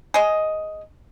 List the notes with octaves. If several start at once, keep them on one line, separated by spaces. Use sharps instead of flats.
G#4 D#5